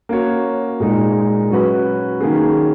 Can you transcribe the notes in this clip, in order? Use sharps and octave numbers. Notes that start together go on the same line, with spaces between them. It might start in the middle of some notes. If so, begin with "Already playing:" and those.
A#3 C#4 F#4 C#5
A#2 G#3 D#4
F#3 C#4 F#4 B4
D#3 A#3 C#4 G#4